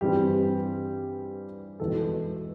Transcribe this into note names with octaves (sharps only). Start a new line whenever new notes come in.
G2 E3 G3 C4 G4
E1 E2 B2 A4